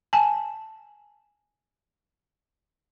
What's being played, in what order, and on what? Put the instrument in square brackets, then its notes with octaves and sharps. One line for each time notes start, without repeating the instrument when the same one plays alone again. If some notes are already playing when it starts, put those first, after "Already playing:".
[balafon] G#5 A5